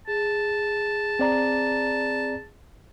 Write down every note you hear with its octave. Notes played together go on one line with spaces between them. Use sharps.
G#4 A5
C4 D5 A#5